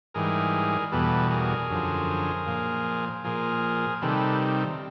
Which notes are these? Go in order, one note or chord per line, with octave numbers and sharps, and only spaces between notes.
G#2 E3 G3 G#4 A#4
E2 B2 G3 A4 B4
G#4 A#4
F#2 D3 F3
A#2 F3
A#2 F3 G#4 A#4
C3 D#3 G3 A4 B4